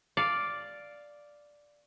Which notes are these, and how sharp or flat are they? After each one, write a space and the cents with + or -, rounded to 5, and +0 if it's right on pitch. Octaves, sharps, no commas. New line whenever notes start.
D5 +0 F5 +0